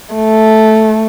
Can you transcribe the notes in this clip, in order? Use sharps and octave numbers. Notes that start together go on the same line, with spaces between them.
A3